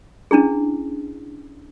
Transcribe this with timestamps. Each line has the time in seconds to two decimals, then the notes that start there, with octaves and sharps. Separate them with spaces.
0.31 C#4 D4 E4 G#4